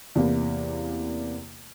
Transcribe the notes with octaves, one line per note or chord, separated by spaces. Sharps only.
E2 C3 E3 A#3